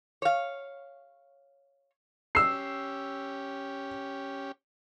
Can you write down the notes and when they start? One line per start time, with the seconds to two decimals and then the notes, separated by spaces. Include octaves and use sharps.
0.22 C#5 F5
2.35 C#4 G4 E6 C7